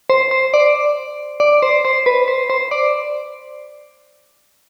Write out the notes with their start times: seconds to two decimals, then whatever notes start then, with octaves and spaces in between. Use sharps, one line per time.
0.10 C5
0.31 C5
0.54 D5
1.40 D5
1.62 C5
1.85 C5
2.06 B4
2.28 C5
2.50 C5
2.71 D5